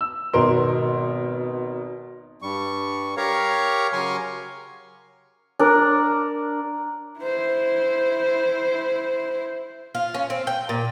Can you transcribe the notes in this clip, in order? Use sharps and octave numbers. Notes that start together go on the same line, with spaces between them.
E6
G#1 B2 A#4 C6
G2 G3 C#6
G4 A#4 C#5 F5 A#5 C#6
C#3 F#3 A#4 G#5 C6 C#6
D4 A#4
E4 C5
F4
C#4
C4
G5
A#2